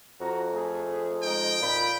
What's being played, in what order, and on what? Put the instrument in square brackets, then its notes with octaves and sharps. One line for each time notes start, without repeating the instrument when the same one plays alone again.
[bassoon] F2 [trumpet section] F#4 A#5
[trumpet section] A3 G#4
[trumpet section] G#3 D#4 [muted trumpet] G5
[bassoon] A#2 [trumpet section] B5